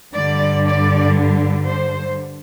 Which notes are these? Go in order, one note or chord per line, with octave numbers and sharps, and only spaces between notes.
G2 D3 G3 D5
D5
C5